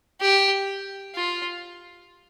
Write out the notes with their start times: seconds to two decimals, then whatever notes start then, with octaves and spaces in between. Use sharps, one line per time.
0.21 G4
1.15 F4